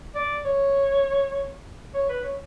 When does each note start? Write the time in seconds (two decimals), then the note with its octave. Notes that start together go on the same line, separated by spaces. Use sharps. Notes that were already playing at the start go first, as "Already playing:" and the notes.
0.15 D5
0.45 C#5
1.94 C#5
2.09 B4
2.24 C#5